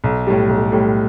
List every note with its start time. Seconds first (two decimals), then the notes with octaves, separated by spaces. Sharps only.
0.04 B1
0.27 A2 G3
0.49 B1
0.72 A2 G3